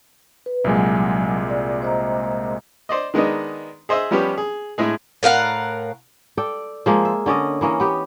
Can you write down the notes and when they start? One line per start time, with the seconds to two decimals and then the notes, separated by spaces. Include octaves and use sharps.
0.46 B4
0.64 C2 A#2 F#3 G#3 G#5
1.50 D5
1.82 C5 D#5 A#5
2.89 C5 D5 D#5
3.14 D#3 G#3 B3 D4 D#4
3.89 G#4 C5 D#5 E5
4.11 F3 G3 B3 C#4 G4
4.38 G#4
4.78 A2 G#3 G#4
5.23 A2 A#4 F5 F#5
6.37 A4 D5 G5
6.86 F3 G#3 A#3 F4
7.05 E5
7.26 D3 C#4 D5 D#5
7.61 E3 A#3 C#4 D#5
7.80 B3 G4